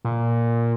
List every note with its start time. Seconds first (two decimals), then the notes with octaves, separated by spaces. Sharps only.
0.05 A#2